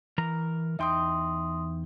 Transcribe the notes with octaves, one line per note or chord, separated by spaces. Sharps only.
E3 A#4 A#5
E2 D#4 E5 G5 C6 D#6